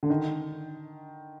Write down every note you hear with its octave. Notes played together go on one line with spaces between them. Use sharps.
D3
D#3